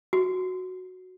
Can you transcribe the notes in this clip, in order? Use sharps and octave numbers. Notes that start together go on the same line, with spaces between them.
F#4